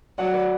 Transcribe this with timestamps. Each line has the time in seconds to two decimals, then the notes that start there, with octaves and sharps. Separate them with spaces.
0.18 F#3 D5 F#5
0.33 B4 D5